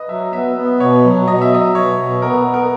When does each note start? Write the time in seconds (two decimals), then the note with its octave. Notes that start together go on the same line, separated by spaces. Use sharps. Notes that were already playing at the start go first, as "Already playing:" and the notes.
Already playing: B4 D#5
0.09 F#3 E5
0.33 B3 E5
0.56 B3
0.80 B2 C#5
1.04 F#3
1.28 B2 D#5
1.41 E5
1.51 F#3 D#5
1.75 B2 C#5
1.99 B2
2.22 B3 A#4
2.46 B3
2.54 A#4